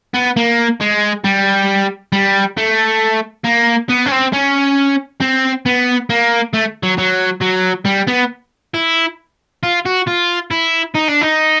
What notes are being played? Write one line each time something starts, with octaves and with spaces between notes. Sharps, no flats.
B3
A#3
G#3
G3
G3
A3
A#3
B3
C#4
C4
C#4
C4
B3
A#3
A3
F#3
F#3
F#3
G3
B3
E4
F4
F#4
F4
E4
D#4
D4
D#4